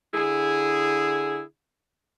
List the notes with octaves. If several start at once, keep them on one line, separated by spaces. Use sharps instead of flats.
D3 E4 G#4